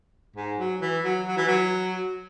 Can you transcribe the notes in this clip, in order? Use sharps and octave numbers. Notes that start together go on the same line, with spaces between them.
G#2
F#3
E3
F#3
F#3
E3
F#3